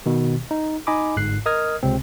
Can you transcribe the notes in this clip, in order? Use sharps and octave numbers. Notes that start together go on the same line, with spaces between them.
B2 D#3
D#4
D#4 D#5 G#5 B5 D6
G1 G#2 F#6 C7
A#4 D#5 D#6 F6 G#6
C#2 C3 C4